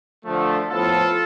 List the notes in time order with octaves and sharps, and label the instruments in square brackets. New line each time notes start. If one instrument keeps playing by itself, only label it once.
[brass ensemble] D3 F3 A3
A2 F3 B3 F4 A4